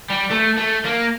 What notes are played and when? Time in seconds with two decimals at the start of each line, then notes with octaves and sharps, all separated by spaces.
0.10 G3
0.30 A3
0.58 A3
0.85 A#3